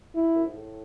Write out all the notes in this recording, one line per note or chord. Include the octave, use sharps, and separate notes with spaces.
E4
F#2
G#2
A2